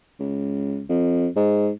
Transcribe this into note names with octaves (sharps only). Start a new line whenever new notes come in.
C#2
F2
G#2